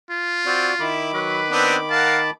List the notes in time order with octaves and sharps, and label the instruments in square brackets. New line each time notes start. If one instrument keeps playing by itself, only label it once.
[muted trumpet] F4
[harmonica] C4 [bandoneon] F#4 D5
[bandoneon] D#3 B5 D6 [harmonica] E4
[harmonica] F#3 [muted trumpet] B4
[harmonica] B3 C4 D4
[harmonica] A#4 F5 F#5 [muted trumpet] A5